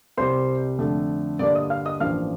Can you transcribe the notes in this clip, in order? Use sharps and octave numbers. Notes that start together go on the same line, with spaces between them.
C2 C3 G3 C5 C6
F2 D3 A3
G2 D3 G3 A#3 D5 D6
D#5 D#6
F5 F6
D#5 D#6
A1 G2 F3 A#3 F5 F6